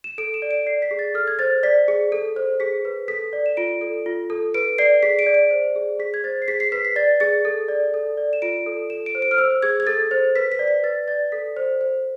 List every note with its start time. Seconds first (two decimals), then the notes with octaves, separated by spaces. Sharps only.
0.04 E7
0.18 A4 D7
0.34 E7
0.42 D5
0.51 D7
0.66 D5 C7
0.82 B6
0.91 G#4
0.99 A6
1.14 A4 F6
1.27 G#6
1.39 C5 A6
1.63 D5 B6
1.88 G#4
2.12 A4
2.36 C5
2.60 G#4 B6
2.85 B4
3.08 A4 B6
3.33 D5
3.46 E7
3.57 F4 D7
3.81 A4
4.06 F4
4.30 A4
4.54 B4 D7
4.78 D5 C7
5.03 G#4 B6
5.19 D7
5.26 D5
5.35 D7
5.51 C5
5.76 G#4
5.99 G#4 B6
6.14 G#6
6.24 C5 A6
6.42 C7
6.48 G#4 B6
6.60 C7
6.72 B4 B6
6.85 B6
6.96 D5 A6
7.20 G#4 A6
7.45 A4
7.68 D5
7.94 A4
8.17 D5
8.33 E7
8.42 F4 D7
8.66 A4
8.90 A4 E7
9.06 D7
9.15 C5
9.22 D7
9.31 F6
9.38 C5 E6
9.62 G#4 G#6
9.80 G#6
9.87 A4 A6
10.11 C5
10.36 B4 B6
10.52 B6
10.59 D5
10.68 B6
10.84 B4 A6
11.08 D5 A6
11.32 A4 B6
11.57 C5
11.81 C5